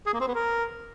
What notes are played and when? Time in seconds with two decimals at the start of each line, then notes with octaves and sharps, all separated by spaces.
0.06 G#4
0.13 A#3
0.20 C4
0.28 B3
0.35 A#4